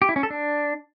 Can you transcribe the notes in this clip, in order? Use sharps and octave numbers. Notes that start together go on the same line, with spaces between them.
G4
E4
C#4
A4
D4